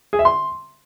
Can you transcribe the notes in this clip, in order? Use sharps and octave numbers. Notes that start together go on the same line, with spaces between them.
G#4
E5
C6